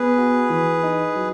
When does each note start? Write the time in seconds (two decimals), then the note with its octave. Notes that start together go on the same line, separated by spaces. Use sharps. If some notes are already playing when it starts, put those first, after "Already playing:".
Already playing: B3 G#4 B4
0.18 F#4
0.50 E3
0.83 D#4
1.15 F#3